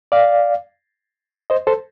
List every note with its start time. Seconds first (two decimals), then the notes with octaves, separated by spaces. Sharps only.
0.12 D5 F5
1.50 C5 D#5
1.67 A4 C5